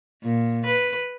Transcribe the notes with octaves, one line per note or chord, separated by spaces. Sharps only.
A#2
B4